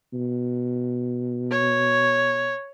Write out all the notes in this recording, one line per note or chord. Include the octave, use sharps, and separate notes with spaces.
B2
C#5